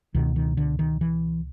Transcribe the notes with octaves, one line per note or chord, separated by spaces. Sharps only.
C#2 B2 D#3
D#3
D3
D#3
E3